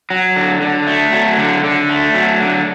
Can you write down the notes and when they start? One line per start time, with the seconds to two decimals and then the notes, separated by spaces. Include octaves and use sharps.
0.10 F#3
0.36 D3
0.62 D3
0.87 A3
1.13 F#3
1.38 D3
1.64 D3
1.89 A3
2.14 F#3
2.40 D3